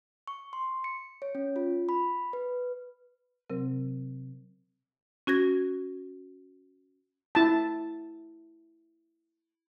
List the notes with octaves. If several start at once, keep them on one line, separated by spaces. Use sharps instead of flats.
C#6
C6
C#7
C#5
C#4
F4
B5
B4
C3 F#3 C4 A#4
C#4 F#4 G#6 A#6
E4 A5